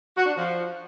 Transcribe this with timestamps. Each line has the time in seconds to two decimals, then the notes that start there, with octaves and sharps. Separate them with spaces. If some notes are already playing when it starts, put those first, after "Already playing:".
0.16 F#4
0.26 D4
0.35 F3